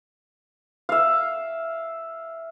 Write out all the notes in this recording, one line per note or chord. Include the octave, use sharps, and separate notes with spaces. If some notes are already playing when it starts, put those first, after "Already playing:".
E5 F5